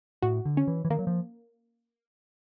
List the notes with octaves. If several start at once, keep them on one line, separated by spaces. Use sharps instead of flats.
A2 F#4
D3
C#4
E3
E3
D#3 A#3
F#3
F3